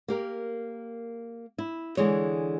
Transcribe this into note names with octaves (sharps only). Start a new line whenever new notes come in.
A#3 G4 A#4
E4
D3 E3 G#3 G#4 C#5